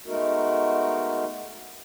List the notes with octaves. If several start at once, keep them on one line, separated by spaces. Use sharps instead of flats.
G#3 A3 B3 D#4 F#4 A#4